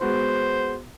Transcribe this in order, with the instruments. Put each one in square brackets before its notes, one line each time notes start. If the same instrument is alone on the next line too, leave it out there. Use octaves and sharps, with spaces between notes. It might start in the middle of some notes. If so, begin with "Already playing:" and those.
[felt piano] G#3 B3 F#4 [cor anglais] C5